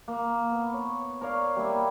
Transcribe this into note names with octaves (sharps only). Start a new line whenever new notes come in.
A#3
B3
C#5
A#4 C#5 D5 F5
G3 A#3 E4